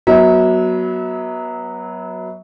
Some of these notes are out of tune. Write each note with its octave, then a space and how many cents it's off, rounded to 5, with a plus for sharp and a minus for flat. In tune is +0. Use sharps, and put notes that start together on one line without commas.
F#3 +0 B3 -25 E5 -35